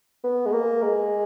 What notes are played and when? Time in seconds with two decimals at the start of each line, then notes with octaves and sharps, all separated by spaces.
0.24 B3
0.46 G#3
0.52 A#3
0.82 G#3